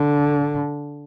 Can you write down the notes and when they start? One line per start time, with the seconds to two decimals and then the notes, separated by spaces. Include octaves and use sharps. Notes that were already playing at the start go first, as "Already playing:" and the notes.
Already playing: D3